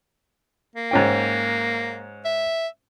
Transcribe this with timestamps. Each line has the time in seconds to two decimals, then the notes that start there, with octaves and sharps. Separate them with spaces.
0.75 A#3
0.91 G#2 C#4 G5
2.25 E5